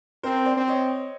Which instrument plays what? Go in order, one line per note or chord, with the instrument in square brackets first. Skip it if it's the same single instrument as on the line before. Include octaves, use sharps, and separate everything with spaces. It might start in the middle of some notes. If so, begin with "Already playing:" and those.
[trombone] C4 [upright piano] A#4 C5
[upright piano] C5 D5
[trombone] C4
[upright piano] C#5 D#5